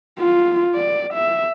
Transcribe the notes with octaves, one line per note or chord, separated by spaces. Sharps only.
F4
D5
E5